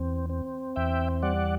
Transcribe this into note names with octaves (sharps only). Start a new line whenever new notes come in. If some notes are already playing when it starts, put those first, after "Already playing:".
Already playing: E2 C4
C4
E2 E5 G5
G3 D5 F#5